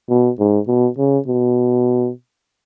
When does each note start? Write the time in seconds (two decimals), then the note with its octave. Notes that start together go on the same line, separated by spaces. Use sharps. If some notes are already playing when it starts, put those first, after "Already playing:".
0.09 B2
0.39 G#2
0.68 B2
0.98 C#3
1.27 B2